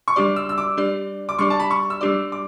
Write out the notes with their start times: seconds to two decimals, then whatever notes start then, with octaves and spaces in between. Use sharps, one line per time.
0.08 C#6
0.16 G3 D4 G4 D5 D6
0.36 E6
0.49 E6
0.58 D6
0.77 G3 D4 G4 D5
1.29 D6
1.39 G3 D4 G4 D5 C#6
1.50 A5
1.60 B5
1.71 C#6
1.90 E6
2.01 G3 D4 G4 D5 D6
2.32 D6